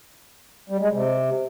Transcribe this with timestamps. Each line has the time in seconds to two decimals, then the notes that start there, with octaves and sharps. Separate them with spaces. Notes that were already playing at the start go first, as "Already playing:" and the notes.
0.70 G3
0.81 G#3
0.92 C3